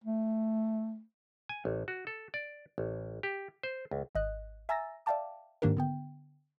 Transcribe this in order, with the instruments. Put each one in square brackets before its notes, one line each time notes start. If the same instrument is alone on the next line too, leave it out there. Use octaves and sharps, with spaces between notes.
[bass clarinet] A3
[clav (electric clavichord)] G#5
A1
F#4
A4
D5
A1
G4
C5
C#2
[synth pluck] G#1 D#5 F#6
E5 G#5 A#5 E6 A6 A#6
D5 E5 F5 G5 A5 D6
G#2 D#3 A#3 D4 G4 A#4
D3 B3 G5